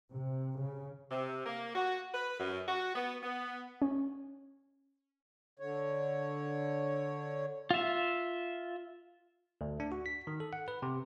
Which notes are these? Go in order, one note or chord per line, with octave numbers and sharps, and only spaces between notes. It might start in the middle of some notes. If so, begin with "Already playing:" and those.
C3
C#3
C3
A#3
F#4
B4
F#2
F#4
B3
B3
C#4
D3 C#5
F4 E5
D2
D4
F#4
B6
D#3
A4
F#5
B4
C3